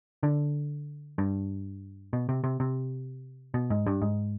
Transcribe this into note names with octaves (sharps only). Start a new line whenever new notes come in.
D3
G2
B2
C3
C3
C3
B2
G#2
G2
G#2